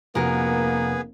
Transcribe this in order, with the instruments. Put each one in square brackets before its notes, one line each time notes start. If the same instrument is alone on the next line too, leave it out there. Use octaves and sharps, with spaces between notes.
[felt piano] F1 F3 G#5 [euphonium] A#3 [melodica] B3 G#4 [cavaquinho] F#4 A#4